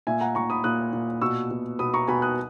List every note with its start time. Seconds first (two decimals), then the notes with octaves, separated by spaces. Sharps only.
0.07 A#2 E5 G#5
0.21 F#5 A#5
0.35 A#2 A#5 C#6
0.50 B5 D#6
0.64 A#2 D#6 F#6
0.93 A#2
1.22 B2 C#6 E6
1.51 B2
1.79 B2 B5 D#6
1.94 A#5 C#6
2.07 B2 G#5 B5
2.22 D#6 F#6